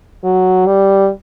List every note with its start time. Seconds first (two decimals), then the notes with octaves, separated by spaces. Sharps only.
0.24 F#3
0.66 G3